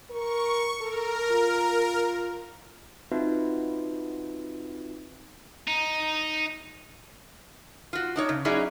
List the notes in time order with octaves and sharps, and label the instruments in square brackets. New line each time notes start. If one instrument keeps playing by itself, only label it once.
[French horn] A#4 [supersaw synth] C#6
[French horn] A4 [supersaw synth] A#4
[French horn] F4
[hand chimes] C4 D#4 F4 F#4 B4 E5
[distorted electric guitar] D#4
[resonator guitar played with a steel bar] F4 F#4
D4 D#4 C#5
C#3
F#3 C#4 D#4 E4 G#4 D5